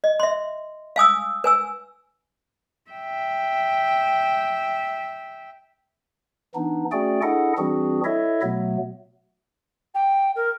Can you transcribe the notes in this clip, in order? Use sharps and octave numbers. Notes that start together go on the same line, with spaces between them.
D#5
E5 C6
F5 G#5 D#6 E6
B4 G#5 E6
E5 G5
E3 B3 D4 D#4
A3 C#4 F#4 G#4 D5 G5
D4 E4 G#4 A4 D#5 F#5
E3 G3 C4 D4 F#4 G#4
E4 A4 C#5 D#5 E5
B2 F#3 A3 B3
G5
A#4